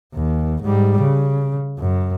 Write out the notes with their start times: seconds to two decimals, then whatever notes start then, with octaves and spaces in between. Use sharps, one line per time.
0.14 D#2
0.63 G#2 G3
1.01 C#3
1.79 F#2